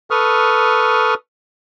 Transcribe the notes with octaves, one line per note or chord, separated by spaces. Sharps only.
A4 B4 C#6 D#6 F6